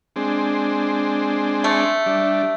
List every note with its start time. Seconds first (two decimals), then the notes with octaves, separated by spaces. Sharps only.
0.16 G#3 C4 D4
1.64 A3
2.06 G3 D4